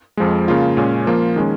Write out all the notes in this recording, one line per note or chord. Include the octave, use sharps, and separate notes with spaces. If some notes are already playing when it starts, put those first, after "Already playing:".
F2 F3 G#3
C#3 A#3 F4
A#2 G#3 C#4
F3 A#3 F4
D#3 G#3 C#4